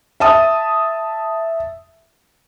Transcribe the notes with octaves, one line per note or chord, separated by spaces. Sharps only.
E5 A5 D#6